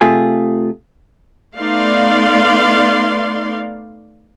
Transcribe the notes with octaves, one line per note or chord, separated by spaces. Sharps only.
C3 A3 F4 G#4
A3 B3 D#4 D5 F5 C6